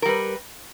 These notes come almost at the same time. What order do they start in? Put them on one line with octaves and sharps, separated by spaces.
A#4 G3 B4